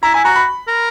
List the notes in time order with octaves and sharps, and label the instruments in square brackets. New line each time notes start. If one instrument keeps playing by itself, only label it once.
[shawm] E4 [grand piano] A#5
[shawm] E4 [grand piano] G#5
[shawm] F#4 [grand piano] A#5
[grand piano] B5
[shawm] A#4